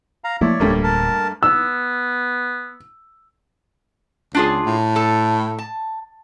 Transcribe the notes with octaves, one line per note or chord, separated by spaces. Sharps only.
F5 A#5
F3 A3 A#3 E4 C#5 D5
D1 G2 A3 A#3
A#4 A5
B3 E6
C#2 D4 F4 G#4
A2
A4 A5
A5